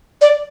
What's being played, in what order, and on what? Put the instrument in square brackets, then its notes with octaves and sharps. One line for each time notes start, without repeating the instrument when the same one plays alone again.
[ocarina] D5